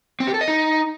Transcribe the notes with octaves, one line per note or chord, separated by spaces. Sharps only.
C4
G4
A4
D#5
D#4